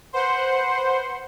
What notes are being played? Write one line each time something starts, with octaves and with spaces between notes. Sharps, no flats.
B4 C5 F#5 C6